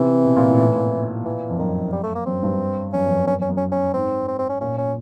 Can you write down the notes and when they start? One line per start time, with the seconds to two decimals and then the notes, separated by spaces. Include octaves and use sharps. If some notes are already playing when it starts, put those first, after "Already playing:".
Already playing: C3 E3
0.25 B2
0.36 A#2
0.48 A2
0.59 A2
0.75 A#2
1.25 E3
1.49 F2
1.59 F#2 D#3
1.92 G3
2.03 A3
2.15 A#3
2.26 F#2 C4
2.43 G2
2.93 F#2 C#4
3.06 F2
3.10 F#2
3.27 F#2 C#4
3.38 F#2
3.42 C#4
3.49 F#2
3.57 C#4
3.71 C#4
3.94 G#2 C4
4.28 C4
4.39 C4
4.49 C#4
4.61 A#2 C#4
4.78 C#4